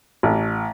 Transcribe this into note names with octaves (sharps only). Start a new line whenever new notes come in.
A1